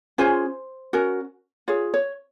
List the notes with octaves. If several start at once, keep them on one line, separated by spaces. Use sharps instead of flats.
C#4 F4 G#4 C5
C#4 F#4 A#4
F4 G#4 C#5
C#5